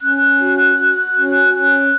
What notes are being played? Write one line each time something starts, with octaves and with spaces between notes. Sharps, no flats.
C#4 F#6
F#4
F#4
C#4
C#4 F#6